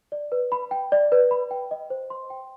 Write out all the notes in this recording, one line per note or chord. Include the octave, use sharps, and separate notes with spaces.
D5
B4
B5
G5
D5
B4
B5
G5
D#5
C5
C6
G5